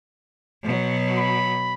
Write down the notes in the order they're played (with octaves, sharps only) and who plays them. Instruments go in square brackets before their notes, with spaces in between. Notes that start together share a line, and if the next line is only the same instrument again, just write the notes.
[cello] B2 F#3
[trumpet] B5